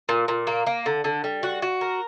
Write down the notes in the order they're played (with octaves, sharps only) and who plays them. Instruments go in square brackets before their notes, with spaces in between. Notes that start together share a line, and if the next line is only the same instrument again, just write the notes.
[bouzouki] A#2
A#2
A#3
A#3
D3
D3
G3
F#4
F#4
A#4